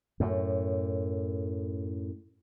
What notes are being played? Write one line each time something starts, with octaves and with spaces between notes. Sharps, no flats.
F#2 A2